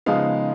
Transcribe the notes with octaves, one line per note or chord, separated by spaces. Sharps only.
C#3 F3 G#3 B3 D#4 F5